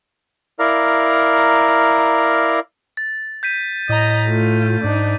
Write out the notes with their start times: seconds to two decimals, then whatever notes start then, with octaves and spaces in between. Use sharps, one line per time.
0.59 E4 A#4 D5 F5 A#5
2.97 A6
3.43 G6 B6 D#7
3.89 A2 D#5 A#5
4.26 A3 F4
4.84 G#2 D4 D#4